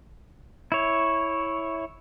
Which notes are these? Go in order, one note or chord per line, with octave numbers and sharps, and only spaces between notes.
E4 C#5